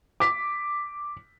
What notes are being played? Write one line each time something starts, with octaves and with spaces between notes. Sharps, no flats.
D6 B6